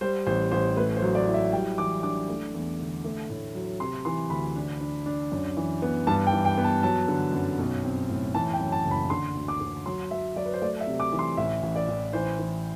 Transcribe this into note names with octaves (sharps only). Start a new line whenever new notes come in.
G3 C5
A1 C5
A1 C5
A3 B4
C5
F#3
D5
E4
E5
G3 G5
E3 D6
D4 D6
A3
E2
D3
A3
A2
F#3
C3 C6
E3 C6
D2 B5
D4
D4
D4
F#2
E3
B3
G2 A5
G5
E3
G5
B3
A5
F#3 A5
D3
F#2
B1
C4
A2
E3 A5
G5
F#2
A5
F#1
B5
D3 C6
D2
D6
D3
F#3 C6
F#3 E5
F#3 D5
B4
C5
A3 D5
E5
C3
D6
E3
C6
A1 E5
A1
D5
A1
E3 C5
E3